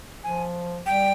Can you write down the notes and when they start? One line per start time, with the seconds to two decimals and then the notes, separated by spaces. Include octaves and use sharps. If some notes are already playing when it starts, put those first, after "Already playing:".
0.24 F3 G#5
0.86 G3 G5